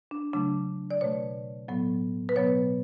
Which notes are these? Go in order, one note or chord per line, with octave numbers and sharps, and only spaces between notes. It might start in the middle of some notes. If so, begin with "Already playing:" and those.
D4
C#3 F#3 A3 D4
D5
B2 A3 C#5
A2 F#3 B3
B4
B2 F#3 B3 C#5